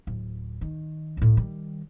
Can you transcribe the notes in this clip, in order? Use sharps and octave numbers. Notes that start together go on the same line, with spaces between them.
D1
D#3
C#2 A2
D#3 G3